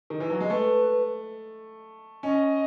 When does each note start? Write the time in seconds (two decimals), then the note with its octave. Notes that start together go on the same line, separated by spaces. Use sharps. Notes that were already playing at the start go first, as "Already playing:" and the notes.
0.10 D#3
0.20 E3
0.30 F#3
0.40 G#3
0.50 A3 B4
2.23 C#4 D#5